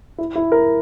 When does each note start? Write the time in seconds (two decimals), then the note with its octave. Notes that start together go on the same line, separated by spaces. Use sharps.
0.18 E4
0.35 E4
0.52 A#4